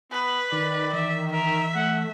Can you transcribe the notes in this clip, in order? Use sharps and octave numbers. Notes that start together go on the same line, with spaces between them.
B3 B4
D#3 D5
E3 E5
A#4 E5
A3 F#5